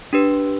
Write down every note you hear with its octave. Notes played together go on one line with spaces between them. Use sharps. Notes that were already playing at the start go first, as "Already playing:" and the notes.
D4 G4 B4